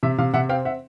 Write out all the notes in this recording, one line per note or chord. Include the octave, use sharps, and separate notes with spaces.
C3 E5
C3 F5
C3 E5 F#5
C4 F5 G5
E5 F#5